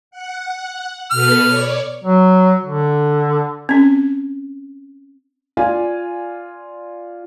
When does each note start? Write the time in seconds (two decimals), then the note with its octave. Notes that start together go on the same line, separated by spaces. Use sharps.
0.11 F#5
1.11 B2 A4 B4 F6
1.46 C#5 D5
2.04 F#3
2.64 D3
3.69 C4 C#4
5.57 F4 D5 G#5